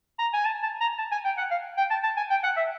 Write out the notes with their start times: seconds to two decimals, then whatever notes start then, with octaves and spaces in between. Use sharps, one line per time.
0.19 A#5
0.34 G#5
0.46 A5
0.63 A5
0.81 A#5
0.98 A5
1.12 G#5
1.25 G5
1.37 F#5
1.51 F5
1.78 G5
1.90 A5
2.03 A5
2.17 G#5
2.30 G5
2.43 F#5
2.57 E5